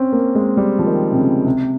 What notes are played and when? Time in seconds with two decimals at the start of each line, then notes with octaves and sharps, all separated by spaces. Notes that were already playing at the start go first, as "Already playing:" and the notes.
Already playing: C4 C#4
0.13 A#3
0.35 G#3
0.57 G3
0.79 F3
0.86 D#3
1.12 C3
1.17 C#3
1.45 C3